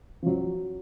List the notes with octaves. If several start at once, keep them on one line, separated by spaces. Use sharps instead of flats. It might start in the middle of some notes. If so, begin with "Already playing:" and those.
F3
F#3